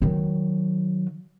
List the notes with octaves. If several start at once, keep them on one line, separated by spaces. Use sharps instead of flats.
D#3 F#3